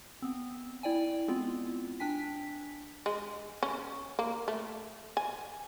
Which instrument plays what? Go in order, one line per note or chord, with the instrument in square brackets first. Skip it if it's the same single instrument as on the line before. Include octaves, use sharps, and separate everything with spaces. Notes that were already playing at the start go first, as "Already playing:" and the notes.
[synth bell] B3 C4
E4 D5 G5 G#5
G#3 B3 C4 E4 F4
D4 G5 G#5 B6
[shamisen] G#3
C#4
A#3
A3
G#5